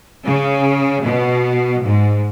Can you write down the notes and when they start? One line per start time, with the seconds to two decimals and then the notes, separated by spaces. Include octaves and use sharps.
0.25 C#3
1.04 B2
1.84 G#2